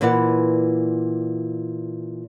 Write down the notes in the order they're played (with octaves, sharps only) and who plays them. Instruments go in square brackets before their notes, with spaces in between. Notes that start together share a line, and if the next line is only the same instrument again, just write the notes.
[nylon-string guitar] A#2 E3 B4 D5 F#5